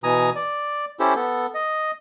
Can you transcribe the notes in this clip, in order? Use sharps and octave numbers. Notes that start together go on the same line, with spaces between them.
B2 E3 G#5 A#5 D#6
D5
C#4 E4 G4 A4 C5
B3 A4
D#5